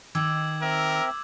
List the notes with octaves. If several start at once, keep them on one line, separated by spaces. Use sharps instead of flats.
D#3 D#4 G5 D6 E6 G#6
C4 A#4 E5